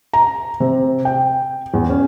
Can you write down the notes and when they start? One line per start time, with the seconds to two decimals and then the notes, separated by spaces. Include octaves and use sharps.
0.13 A#5
0.60 C3
1.05 G5
1.74 E2
1.90 C#4